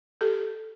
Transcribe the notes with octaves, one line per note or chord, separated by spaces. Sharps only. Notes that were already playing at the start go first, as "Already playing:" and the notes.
G4 A4